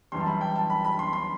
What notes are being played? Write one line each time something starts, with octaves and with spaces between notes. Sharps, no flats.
F#2 E3 G3 C6
A5
B5
G5
A5
B5
B5
C6
C6